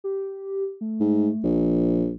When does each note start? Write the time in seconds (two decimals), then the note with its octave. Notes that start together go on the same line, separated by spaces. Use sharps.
0.04 G4
0.81 A3
1.01 G#2
1.44 A#1 F3